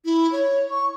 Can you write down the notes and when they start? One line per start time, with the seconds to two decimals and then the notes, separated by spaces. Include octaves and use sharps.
0.05 E4
0.32 C#5
0.71 C#6